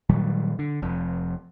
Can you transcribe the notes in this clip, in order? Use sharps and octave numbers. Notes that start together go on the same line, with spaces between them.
A#2 D#3 F#3 G3
D3
F1 F2